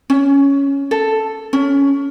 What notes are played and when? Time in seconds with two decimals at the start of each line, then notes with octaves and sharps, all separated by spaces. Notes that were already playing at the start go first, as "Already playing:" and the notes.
0.10 C#4
0.91 A4
1.53 C#4